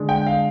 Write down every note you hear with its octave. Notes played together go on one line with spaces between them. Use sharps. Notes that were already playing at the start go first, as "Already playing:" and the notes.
Already playing: D3 G#3 D4
G5
F5